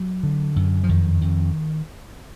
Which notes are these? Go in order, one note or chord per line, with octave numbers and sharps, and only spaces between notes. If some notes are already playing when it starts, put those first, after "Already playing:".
Already playing: F#3
D3
F#2
F3
F2 D#3
F2